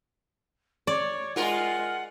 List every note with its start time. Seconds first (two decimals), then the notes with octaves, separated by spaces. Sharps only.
0.87 C#5 D5
1.36 G#3 F4 A#4 F#5